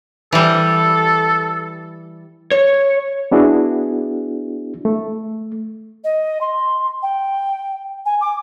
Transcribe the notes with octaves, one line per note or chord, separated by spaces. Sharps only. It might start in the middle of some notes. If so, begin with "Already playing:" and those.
E3 G3 A4
C#5
B3 D4 E4 F#4 G#4
A3
D#5
C6
G5
G#5
D6